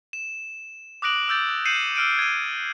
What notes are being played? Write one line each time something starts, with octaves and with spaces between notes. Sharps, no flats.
E7
D6 D#6 F#6 A#6 D7 F#7
D6 E6 G6 A6
G6 C7 C#7 D#7 E7 F#7
E6 F6 D7 D#7
G#6 D#7